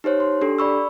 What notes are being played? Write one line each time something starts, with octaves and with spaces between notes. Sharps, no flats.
D#4 G4 C5 C#5
C6
D4 G4 A4
D5 B5 C#6 E6